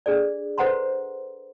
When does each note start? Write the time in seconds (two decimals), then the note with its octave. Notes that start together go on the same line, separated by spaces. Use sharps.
0.06 D4 G#4 A4 D5
0.58 A4 B4 C5 F#5 A#5 C6